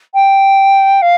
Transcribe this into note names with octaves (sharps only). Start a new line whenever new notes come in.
G5
F5